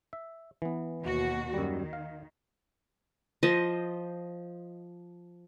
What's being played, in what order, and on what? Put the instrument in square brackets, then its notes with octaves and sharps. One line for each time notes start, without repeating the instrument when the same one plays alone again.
[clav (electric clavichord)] E5
E3 B3
[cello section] D#2 B2 F#4
[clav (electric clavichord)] F#2 G3 [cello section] D#3
[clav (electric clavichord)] F5
[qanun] F3 C5 D#5